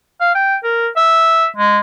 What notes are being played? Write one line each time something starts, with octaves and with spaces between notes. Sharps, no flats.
F5
G5
A#4
E5
G#3